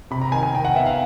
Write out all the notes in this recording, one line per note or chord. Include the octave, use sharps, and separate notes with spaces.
C3 B5
A#5
D#3 G#5
G#5
D#3 G5
F#5
B3 E5
F5